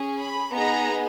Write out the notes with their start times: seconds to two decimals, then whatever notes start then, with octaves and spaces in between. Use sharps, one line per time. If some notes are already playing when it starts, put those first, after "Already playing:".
Already playing: C#4 G#4
0.19 B5
0.53 B3 D#4 G#4 A#5